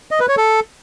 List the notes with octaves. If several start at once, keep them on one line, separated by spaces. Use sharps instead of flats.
D#5
B4
C#5
A4